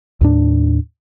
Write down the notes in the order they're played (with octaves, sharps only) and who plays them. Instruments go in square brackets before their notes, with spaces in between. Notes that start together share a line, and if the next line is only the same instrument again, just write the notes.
[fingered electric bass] D#2 A2 D4